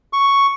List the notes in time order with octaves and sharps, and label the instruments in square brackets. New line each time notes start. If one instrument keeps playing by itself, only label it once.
[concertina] C#6